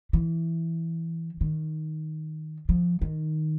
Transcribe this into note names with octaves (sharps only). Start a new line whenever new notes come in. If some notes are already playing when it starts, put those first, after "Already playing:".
E3
D#3
F3
D#3